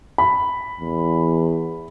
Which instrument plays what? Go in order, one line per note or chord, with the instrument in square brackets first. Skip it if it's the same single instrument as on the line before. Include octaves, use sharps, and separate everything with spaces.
[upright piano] B5
[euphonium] E2